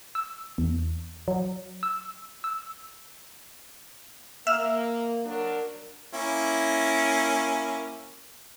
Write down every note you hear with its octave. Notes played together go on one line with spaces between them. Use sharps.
E6
E2
F#3
E6
E6
A#3 E5 E6 F6
F#3 D4 A#4
A#3 C#4 E4